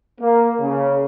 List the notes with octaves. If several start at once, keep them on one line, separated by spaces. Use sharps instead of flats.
A#3
C#3